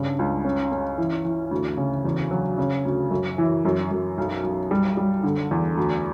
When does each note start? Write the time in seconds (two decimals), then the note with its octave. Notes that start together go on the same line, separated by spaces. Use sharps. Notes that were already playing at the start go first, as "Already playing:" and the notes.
Already playing: G2 C#3
0.19 C#2
0.44 C#4
0.72 C#4
0.98 E3
1.25 E3
1.51 D2
1.77 C#3
2.05 E2
2.31 F#3
2.58 C#3
2.85 D2
3.11 F#2
3.38 E3
3.65 F#2
3.91 F#2
4.18 B1
4.44 B1
4.71 G3
4.97 G3
5.23 D3
5.51 E2
5.77 D2